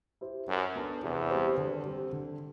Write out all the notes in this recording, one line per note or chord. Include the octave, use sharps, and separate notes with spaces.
E4 G4 C5
F#2 F#3
B3 D4 A4
E2 C3
G3 C4 G4 C5
D3
G3 C4
D3